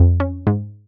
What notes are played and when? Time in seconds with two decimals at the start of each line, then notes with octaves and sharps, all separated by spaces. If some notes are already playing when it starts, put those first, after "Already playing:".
Already playing: F2
0.20 C#4
0.47 G#2